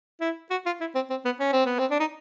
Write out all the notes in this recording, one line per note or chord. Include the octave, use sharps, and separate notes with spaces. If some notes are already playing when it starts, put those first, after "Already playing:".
E4
F#4
F4
E4
C4
C4
B3
C#4
C4
B3
C4
D4
D#4